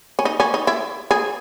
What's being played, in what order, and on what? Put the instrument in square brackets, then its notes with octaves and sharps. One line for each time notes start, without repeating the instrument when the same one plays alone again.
[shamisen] C#4
D#4
C#4
D#4
E4
G#4